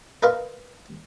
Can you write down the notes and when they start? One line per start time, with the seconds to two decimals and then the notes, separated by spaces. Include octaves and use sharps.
0.23 A#4 B4 D#5 F5 A#5 C6